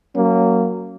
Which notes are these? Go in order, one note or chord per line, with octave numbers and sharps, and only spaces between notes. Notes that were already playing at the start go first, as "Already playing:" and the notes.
F#3 A#3 C#4